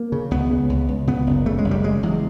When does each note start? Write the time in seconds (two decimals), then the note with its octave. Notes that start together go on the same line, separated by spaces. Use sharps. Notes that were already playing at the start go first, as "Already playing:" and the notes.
Already playing: A#3
0.12 C#3
0.31 C#2 B3
0.51 C#3
0.70 C#2
0.88 C#2
1.07 C#3 B3
1.27 F#1
1.46 C#3 A3
1.58 G#3
1.64 F#1
1.71 G3
1.84 C#3 G#3
2.03 E2